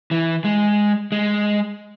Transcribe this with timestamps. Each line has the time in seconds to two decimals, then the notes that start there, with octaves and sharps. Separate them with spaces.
0.11 E3
0.45 G#3
1.12 G#3